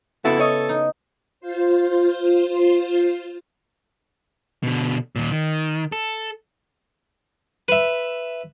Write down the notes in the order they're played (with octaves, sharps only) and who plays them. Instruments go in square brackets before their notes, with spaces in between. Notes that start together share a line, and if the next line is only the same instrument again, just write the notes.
[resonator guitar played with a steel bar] F2 E4 F#4 [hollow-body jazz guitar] C#3 B3 [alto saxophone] A4
[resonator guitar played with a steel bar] C#5 D#5
[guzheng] D#4
[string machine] F4 C5
[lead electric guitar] B2 D3
D#2 A#2
D#3
A4
[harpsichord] B4 E5